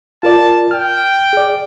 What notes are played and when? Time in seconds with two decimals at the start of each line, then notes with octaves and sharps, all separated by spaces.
0.23 F4 A#4 D5 A5
0.71 G5 F6
1.33 G#4 D5